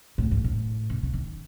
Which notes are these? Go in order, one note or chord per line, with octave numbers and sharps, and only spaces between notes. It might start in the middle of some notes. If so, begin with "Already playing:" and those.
A2
G#2
A2
C#3
C#3
D#3